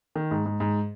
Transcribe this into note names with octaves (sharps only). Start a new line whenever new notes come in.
D#3
G#2
G#2
G#2